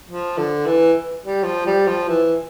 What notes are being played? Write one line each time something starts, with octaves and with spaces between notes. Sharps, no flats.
F3
D3
E3
G3
F3
G3
F3
E3